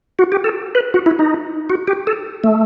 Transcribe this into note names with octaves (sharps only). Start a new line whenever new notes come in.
F#4
G4
A4
B4
F#4
E4
D#4
F#4
G4
A4
A3